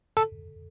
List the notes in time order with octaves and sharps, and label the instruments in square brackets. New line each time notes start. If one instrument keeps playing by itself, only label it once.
[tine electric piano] A4